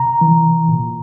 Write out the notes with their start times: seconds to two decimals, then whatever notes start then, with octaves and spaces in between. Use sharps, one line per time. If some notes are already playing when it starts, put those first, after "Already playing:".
Already playing: C3 A#5
0.21 E3
0.69 A#2